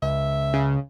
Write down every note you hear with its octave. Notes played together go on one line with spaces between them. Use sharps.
C#2 E5
C#3